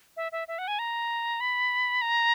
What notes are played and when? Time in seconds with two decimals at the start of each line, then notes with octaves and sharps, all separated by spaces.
0.17 E5
0.32 E5
0.48 E5
0.58 F#5
0.68 G#5
0.79 A#5
1.40 B5
2.01 A#5